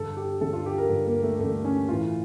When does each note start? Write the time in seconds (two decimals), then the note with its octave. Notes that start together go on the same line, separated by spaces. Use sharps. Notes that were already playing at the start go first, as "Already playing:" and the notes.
Already playing: G2 D3 A4
0.17 G4
0.41 G2 D3 A4
0.53 F4
0.66 G4
0.78 A#4
0.90 G2 D3
1.07 A#3
1.23 A3
1.40 G2 D3 A3
1.65 C#4
1.89 A2 E3 F4